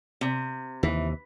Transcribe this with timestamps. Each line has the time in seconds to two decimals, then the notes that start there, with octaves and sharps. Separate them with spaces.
0.21 C3
0.83 D#2 C3 E3